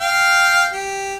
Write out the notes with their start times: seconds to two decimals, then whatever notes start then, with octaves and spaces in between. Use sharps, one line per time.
0.01 F5 G5
0.73 G4